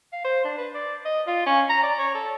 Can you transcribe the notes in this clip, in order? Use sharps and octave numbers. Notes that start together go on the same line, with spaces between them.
F5
C5
D4
B4
D5
D#5
F4
C#4
A#5
D5
C#5
A4